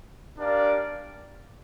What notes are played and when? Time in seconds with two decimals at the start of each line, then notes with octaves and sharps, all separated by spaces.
0.36 D4 G4 A#4 D5 F5